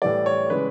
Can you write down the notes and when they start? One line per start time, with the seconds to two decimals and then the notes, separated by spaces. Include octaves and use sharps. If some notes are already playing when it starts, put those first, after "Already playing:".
0.02 A2 E3 G3 D5
0.26 C#5
0.50 C#3 E3 G#3 B4